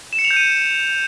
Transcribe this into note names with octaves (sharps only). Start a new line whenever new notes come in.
E7
C#7
F7
G6
D#7